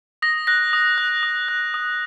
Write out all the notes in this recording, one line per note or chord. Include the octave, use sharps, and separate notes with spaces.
D#6 A#6
F#6 A#6
D#6
F#6
D#6
F#6
D#6